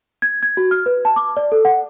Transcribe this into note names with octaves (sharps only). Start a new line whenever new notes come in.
G#6
G#6
F#4
F6
B4
A5
D6
D5
A4
F#5